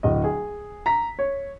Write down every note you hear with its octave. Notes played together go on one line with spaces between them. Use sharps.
D1 D#5
G#4
A#5 B6
C#5